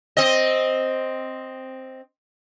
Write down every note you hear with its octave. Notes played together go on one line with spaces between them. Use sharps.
C4 D#5